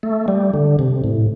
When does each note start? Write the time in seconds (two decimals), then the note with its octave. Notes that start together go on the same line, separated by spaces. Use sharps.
0.03 A3
0.28 G3
0.54 D3
0.79 C3
1.04 A2